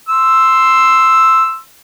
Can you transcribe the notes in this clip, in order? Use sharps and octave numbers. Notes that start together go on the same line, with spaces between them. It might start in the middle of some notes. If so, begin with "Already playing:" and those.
C6 E6